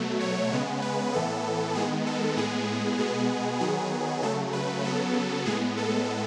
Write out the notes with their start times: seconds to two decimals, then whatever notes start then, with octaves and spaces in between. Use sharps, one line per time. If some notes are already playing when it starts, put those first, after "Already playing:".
Already playing: B2 F#3 A3
0.20 C#5
0.52 C#3 G#3 B3
0.82 B4
1.13 A2 E3 B3 A4
1.75 D#3 G#3 B3 G#4
2.06 A4
2.37 A2 G#3 B3 G#4
2.98 B2 G#3 B3 G#4
3.60 D#3 F#3 B3 G#4
4.22 C#3 F#3 A3 A4
4.53 B4
4.85 C#3 F#3 B3 A4
5.46 A2 G#3 B3 G#4
5.77 A4